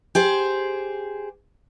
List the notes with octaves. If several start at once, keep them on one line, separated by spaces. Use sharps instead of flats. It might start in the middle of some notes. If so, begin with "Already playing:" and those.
G4 G#4 C5